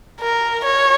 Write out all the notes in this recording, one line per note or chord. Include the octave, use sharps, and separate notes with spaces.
A#4
C#5